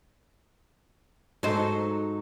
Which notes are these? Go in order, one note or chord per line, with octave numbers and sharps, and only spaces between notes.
G#2 F#3 D#4 A4 C5